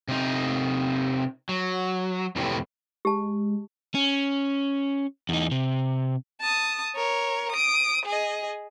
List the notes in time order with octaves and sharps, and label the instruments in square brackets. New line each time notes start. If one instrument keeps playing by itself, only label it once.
[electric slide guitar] C3 D#4
F#3
F2 A2 C3 E3
[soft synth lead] G#3 [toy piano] G4 A5
[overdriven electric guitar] C#4
E2 D#4
C3
[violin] A5 D#6
A#4 C#5
D#6 D7
G#4 D#5